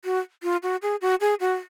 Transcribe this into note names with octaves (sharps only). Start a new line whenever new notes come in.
F#4
F4
F#4
G#4
F#4
G#4
F#4